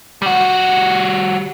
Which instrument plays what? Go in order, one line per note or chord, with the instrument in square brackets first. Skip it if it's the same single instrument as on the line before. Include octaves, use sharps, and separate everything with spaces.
[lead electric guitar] G3 F#4